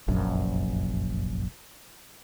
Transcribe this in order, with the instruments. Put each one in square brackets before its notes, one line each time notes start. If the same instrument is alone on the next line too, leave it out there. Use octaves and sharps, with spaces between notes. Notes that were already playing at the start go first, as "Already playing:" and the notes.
[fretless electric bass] F1 A#1 F#2